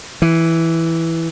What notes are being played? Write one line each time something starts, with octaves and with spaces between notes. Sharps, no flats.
E3